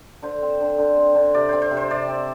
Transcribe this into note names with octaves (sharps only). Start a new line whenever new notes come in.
D3 C5
C4
D3
D3
C4
D3
C3 D5
C4 C5
C5
C3
C5
C3 D5
C4